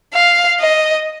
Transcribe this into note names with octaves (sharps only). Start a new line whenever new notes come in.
F5
D#5